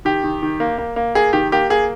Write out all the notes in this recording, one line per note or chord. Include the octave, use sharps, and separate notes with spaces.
D#3 G4
D#3
D#3
A#3
A#3
A#3
A#3 G#4
D#3 G4
A#3 G4
A#3 G#4